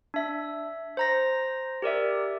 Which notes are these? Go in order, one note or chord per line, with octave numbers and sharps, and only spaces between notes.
D4 E5
C5 A#5 A#6
G4 A#4 D5 E5